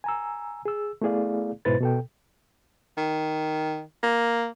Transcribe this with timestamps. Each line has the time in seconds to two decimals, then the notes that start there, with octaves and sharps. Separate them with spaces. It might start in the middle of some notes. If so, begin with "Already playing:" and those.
0.04 G#5 A#5 E6
0.65 G#4 E6
1.02 A3 B3 E4 G#4 D5 F5
1.65 G#2 B2 E4 B4 C5 A6
1.81 B2 A4 G5
2.97 D#3
4.03 A#3